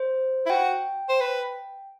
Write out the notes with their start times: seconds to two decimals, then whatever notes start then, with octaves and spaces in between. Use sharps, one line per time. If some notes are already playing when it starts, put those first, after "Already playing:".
Already playing: C5
0.46 E4
0.50 F#4 G5
1.09 C5
1.20 B4